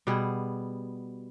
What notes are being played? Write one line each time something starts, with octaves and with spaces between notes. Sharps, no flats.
B2 G3 B3 G#4